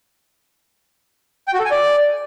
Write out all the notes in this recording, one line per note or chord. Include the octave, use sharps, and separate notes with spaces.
G5
F#4
A4
G#5
D5